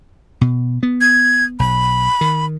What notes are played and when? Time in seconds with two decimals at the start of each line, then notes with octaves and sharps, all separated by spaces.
0.41 B2
0.83 B3
1.01 G#6
1.59 B1 B5
2.21 D#3